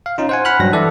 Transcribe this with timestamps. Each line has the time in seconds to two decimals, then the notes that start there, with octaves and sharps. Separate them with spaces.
0.06 F5
0.18 C#4 D#4 F4
0.29 C5 F#5 G#5
0.45 F#5 B5 F6 F#6
0.60 G2 F#3 A#6
0.73 E3 A4 D5 E5